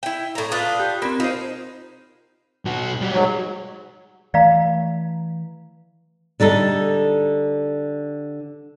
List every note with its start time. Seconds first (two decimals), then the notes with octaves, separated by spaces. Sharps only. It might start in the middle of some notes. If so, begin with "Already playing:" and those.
0.03 E4 G5
0.35 A2 A#5
0.52 D4 F4 B4 D#6 F#6 G7
0.80 G4
1.02 A#3 C4 B5
1.20 D#4 F4 C5
2.65 B1 F#4
3.01 G3 F#4
3.12 G#2 F#3
4.34 E3 A3 D5 F5 A#5
6.40 D3 G3 D#4 A4